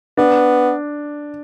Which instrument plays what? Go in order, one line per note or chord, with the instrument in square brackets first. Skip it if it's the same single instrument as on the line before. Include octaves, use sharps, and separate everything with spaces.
[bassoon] B3 [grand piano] D4